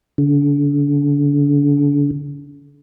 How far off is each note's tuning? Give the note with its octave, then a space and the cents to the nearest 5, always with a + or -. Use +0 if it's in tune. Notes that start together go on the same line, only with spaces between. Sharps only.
D3 -35